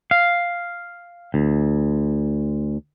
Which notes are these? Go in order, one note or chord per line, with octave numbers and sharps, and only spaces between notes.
F5
D2